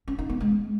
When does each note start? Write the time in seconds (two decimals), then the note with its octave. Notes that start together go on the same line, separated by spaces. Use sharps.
0.08 C#4
0.19 D#4
0.30 B3
0.40 G#3